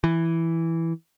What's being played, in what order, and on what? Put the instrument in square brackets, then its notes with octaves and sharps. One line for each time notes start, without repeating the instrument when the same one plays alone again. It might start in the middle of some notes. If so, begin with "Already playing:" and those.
[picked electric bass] E3